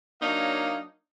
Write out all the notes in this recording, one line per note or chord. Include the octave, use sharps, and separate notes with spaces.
F#3 A#3 D4 D#4 C#5 F5